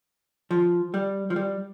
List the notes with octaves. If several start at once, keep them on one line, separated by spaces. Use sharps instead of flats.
F3
G3
F3
G3